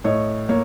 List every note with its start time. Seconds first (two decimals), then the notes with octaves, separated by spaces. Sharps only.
0.04 A2 C#5 D#5
0.49 A#3 C#5